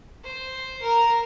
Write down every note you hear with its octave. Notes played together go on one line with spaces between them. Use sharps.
C5
A#4 A#5